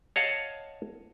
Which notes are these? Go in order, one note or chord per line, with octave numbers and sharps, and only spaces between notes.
C#5 D#5 F5 F#5 A5